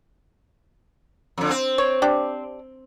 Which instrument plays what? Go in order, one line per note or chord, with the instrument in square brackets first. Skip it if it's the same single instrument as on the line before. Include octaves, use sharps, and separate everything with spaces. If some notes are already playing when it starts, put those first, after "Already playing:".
[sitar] F2 D3
C4
[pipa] C#5
D4 G4